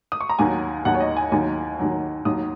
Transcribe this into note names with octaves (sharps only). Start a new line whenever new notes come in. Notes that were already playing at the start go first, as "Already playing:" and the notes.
D#6
C#6
A#5
D#2 D#3 F#3 G#5
D#2 D#3 F#3 F#5
C#5
D#5
G#5
D#2 D#3 F#3 G#5
D#2 D#3 F#3
D#2 D#3 F#3 D#6